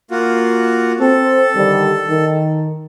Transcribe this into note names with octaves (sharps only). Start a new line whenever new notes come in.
A#3 F4 F#4
C4 A4
D3 D#3 G3
D#3